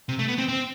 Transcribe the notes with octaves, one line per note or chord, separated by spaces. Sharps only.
C3
A3
B3
C4
C4